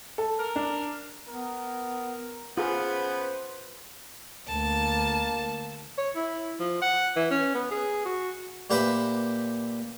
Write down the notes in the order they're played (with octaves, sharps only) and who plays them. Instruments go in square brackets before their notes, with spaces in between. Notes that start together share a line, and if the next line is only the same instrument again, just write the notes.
[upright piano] A4
[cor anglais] A#4
[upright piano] D4
[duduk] B3 [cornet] A#4
[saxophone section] C#3 B3 [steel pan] F4 G#4 [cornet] B4 [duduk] C5
[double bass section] D2 [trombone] A#3 [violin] A5
[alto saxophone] C#5
E4
F3
F#5
E3
C#4
B3
G#4
F#4
[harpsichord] A#2 G4 B4 C5 E5 B5